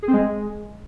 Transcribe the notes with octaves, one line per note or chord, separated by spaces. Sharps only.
G#4
C4
G#3